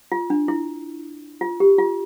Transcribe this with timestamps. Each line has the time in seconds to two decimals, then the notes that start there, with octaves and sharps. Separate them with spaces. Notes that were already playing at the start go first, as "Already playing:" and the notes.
0.12 F4
0.30 D4
0.48 E4
1.41 F4
1.60 G4
1.78 F4